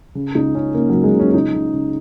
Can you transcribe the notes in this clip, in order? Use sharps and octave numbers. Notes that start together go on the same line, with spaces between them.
C#3
C#2 D#4
C#3 C#4
C#3 A#3
C#2 F#3
G#3
C#2
C#4
C#4
C#3 D#4
C#3
C#3